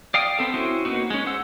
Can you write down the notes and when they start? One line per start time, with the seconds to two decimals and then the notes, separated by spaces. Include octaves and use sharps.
0.14 D5 F5 G5 D#6
0.38 B3 C4 A4 F5
0.54 C4 C#4 E4 F#4 C5
0.85 A#3 B3 D#4 F#4
1.10 G#3 C#4
1.26 C5 F#5 E6